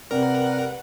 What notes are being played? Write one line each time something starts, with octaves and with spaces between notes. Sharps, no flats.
C3 G3 A#4 B4 F#5